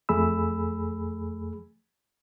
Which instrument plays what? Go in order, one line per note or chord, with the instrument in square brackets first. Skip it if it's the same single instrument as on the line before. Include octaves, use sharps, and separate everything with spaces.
[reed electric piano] F2 A3 G#4 B5 E6